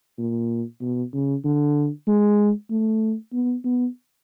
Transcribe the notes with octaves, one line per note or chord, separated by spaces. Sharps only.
A#2
B2
C#3
D3
G#3
A3
B3
B3